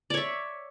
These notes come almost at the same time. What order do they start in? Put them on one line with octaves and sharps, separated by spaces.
D5 C#5 E5